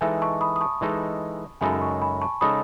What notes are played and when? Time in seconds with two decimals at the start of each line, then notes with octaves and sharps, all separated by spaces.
0.01 E3 G#3 D#4 A4 E5 G#5
0.22 A5 C#6
0.41 B5 D#6
0.56 D#6
0.61 A5 C#6
0.81 E3 G#3 D#4 A4
1.61 F#2 C#3 G#3 D#4 A4 G#5 B5
1.81 A5 C#6
2.02 G#5 B5
2.21 A5 C#6
2.41 C#3 G#3 D#4 A4 B5 D#6